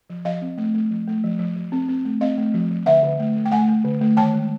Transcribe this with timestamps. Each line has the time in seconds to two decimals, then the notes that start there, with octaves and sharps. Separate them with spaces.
0.10 F3
0.25 F3 D#5 F5
0.42 C4
0.58 A3
0.74 A3
0.91 F3
1.08 A3
1.24 F3
1.39 F3
1.56 F3
1.72 C4
1.89 C4
2.05 A3
2.21 C4 D#5 F5
2.38 A3
2.54 F3
2.70 F3
2.86 D3 E5 F#5
3.03 D3
3.19 A3
3.36 A3
3.45 G5
3.52 A3 F#5 G#5
3.68 A3
3.84 D3
4.01 A3
4.17 D#3 G5 A5
4.34 G#3